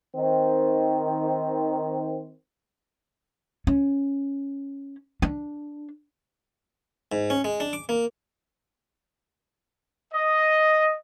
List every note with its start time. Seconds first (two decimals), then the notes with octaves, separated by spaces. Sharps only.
0.16 D#3 C4
3.67 C#4
5.22 D4
7.12 G#2
7.30 C#4
7.44 G#3
7.60 D4
7.73 D6
7.89 A#3
10.13 D#5